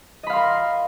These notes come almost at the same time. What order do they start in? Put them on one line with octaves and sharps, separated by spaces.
D#5 B5 F5 C6 A#4